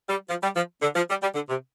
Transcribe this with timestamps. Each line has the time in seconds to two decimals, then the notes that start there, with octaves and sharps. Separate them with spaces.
0.09 G3
0.29 F3
0.43 G3
0.56 F3
0.82 D3
0.96 F3
1.10 G3
1.22 G3
1.35 D3
1.49 C3